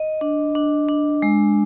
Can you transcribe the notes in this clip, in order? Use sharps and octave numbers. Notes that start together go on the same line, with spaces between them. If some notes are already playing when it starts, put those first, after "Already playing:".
Already playing: D#5
D4
D4
D4
G#3